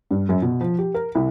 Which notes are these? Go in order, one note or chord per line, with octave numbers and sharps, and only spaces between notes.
G2
F#2
B2
F3
G4
A#4
C2